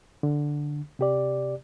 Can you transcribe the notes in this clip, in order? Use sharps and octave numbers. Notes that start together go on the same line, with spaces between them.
D3
C3 G4 D5